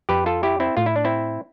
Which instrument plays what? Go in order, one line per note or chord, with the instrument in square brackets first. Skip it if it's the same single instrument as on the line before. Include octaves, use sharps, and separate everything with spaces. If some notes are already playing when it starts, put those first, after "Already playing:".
[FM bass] F2 [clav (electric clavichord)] G4 B4
[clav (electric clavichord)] F4 A4
E4 G4
C4 E4
[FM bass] A2 [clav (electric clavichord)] F4
[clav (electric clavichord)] E4
D4
C4 E4